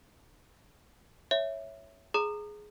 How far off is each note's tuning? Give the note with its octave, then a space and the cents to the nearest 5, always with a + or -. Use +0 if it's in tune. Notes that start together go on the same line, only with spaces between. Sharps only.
C#5 +0 E5 +0
G#4 +10 A#5 -20 D#6 -35